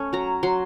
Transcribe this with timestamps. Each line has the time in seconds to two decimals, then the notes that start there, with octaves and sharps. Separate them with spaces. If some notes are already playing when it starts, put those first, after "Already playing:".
Already playing: A3 C#4
0.13 F#3 A#5
0.43 F#3 C6